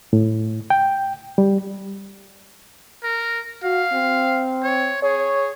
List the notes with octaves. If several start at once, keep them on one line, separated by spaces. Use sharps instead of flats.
A2
G5
G3
A#4
F#4 F5
C4
C#5
G#4 C#5